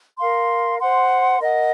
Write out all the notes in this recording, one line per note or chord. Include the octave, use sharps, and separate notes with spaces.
A#4 F5 C6
C5 F#5 C6
A#4 D#5 F#5